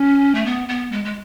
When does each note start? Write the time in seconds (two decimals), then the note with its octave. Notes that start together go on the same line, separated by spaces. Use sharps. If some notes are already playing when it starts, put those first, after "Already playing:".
Already playing: C#4
0.35 A3
0.46 B3
0.69 B3
0.92 G#3
1.05 G#3